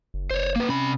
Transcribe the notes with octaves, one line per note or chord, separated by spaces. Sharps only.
F#1
F#1 C5 C#5
A#3 B4
C3 C#4 B5